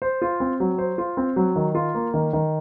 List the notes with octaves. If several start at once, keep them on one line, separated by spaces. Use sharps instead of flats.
C5
F4
C4
F#3
C5
F4
C4
F#3
D#3
F4
A#3
D#3
D#3